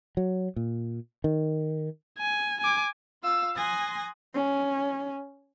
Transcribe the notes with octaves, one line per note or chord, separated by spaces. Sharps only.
F#3
A#2
D#3
G#5
G#5 D6
F4 F5 E6
G#5 C6 D#6 F#6 A#6
C#4